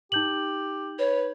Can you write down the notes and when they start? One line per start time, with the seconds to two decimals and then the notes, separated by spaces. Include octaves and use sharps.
0.12 D#4 G4 G6 F#7
0.99 B4 C#5